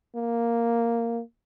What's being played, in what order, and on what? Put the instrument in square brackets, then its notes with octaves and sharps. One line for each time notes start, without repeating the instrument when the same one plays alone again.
[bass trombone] A#3